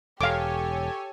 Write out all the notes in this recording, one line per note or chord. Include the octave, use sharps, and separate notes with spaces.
E1 G4 A4 C#5 F5 G#5 D6